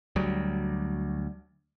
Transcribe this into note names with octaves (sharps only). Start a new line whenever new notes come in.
D2 F#3 G3